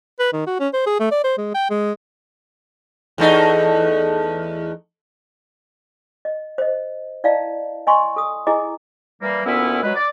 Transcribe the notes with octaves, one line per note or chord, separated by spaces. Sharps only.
B4
D#3
F#4
C#4
C5
G#4
A3
D5
C5
G#3
G5
G#3
E2 A3 D#4
D#5
C5 D#5
E4 D5 D#5 F5 A5
D#5 G#5 C6 C#6
A4 D#6
E4 G#4 D#5 G#5 A#5
E3 G3 A#3
D2 A#2 B3 C#4 E4
F#3 G#3 B4
D5